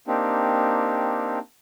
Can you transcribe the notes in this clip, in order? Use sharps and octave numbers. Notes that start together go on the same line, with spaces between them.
A#3 C4 D4 D#4 G4